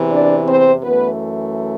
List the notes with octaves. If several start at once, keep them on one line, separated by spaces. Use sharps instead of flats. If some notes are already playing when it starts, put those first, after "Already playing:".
Already playing: E2 C3 E3
D4 D5
C4 C5
F#2 E3 A3 B3 B4